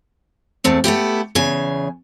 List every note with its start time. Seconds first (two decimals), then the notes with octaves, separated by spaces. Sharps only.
0.64 E2 A3 C4
0.84 A3 B3 E4 G4
1.35 E2 C#3 G#5